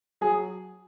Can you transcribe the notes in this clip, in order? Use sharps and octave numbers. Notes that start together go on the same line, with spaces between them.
F#3 G#4